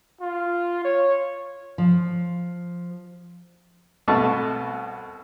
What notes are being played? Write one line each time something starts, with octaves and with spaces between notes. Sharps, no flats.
F4
C#5
F3
C2 B2 A3 A5 C#6